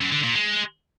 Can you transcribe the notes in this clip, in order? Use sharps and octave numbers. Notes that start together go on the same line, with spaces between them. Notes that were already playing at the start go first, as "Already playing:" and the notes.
F#2
D3
A#2
G#3